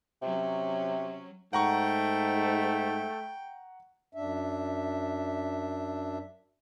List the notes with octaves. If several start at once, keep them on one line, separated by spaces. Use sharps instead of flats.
C3 F#3 C#4
G#2 A3 F#5 G5 A#5 C#6
F#2 D4 E5